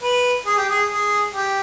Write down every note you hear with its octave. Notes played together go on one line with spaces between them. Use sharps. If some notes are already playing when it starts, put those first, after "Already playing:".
B4
G#4
G4
G#4
G#4
G4